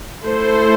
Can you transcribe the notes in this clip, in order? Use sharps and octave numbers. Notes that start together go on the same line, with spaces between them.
A3 E4 A4 C5